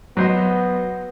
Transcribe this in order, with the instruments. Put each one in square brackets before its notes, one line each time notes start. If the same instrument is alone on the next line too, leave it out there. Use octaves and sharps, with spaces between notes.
[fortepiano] F#3 C5 D#5 [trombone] B3